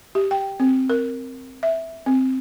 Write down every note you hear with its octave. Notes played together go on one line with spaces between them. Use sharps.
G4
G5
C4
A#4
E5
C4